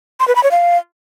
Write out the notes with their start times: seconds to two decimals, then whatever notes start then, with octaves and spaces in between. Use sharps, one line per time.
0.20 C6
0.28 B4
0.36 B5
0.43 C#5
0.51 F5